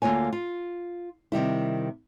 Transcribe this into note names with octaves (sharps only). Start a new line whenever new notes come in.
D2 A#3 F4 C#5 G#5
F4
C3 D#3 G3 E4